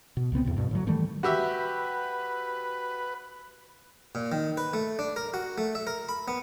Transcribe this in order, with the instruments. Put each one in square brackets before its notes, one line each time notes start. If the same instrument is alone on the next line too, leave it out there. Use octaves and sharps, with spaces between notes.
[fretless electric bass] B2
C#2 C#3 B3 C4
E2 A2 C3
G2 B2
A2 D3 F#3
D#3 E3 G3 A3
[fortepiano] F#4 G4 E5 [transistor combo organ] B4
[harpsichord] A#2
D#3
B4
A3
D4
A#4
F#4
A3
E5
A#4
B5
B3